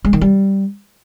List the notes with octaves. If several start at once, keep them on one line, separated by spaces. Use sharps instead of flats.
G#3
D#3
G3